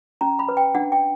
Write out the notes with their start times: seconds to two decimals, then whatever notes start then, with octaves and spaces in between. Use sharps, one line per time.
0.21 C#4 A#5
0.39 B5
0.49 B4
0.57 G5
0.75 D4 F#5
0.92 G5